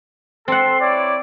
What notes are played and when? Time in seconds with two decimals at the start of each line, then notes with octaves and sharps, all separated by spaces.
0.48 C4 A4 F#5 C6
0.80 E4 C#5 D5